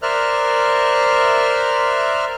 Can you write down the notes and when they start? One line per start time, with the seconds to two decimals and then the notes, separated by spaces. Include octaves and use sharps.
0.02 A#4 C5 D5 E5 F6 F#6